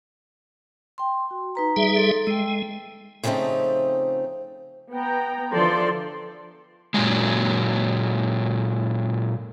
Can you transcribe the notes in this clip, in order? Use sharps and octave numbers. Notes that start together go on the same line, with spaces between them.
G5 C6
F#4
D#4 B4 A#5
G3 G#4 E5
A4 C6
G#3 G5 E6
C#3 F3 G3 A3 C4 D#4
B3 G5 A#5
D3 E3 F3 A4 D5 C6
A#2 C#3 F#3 G#3